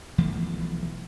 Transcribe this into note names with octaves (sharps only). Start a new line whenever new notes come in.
B1 E3 F3 A3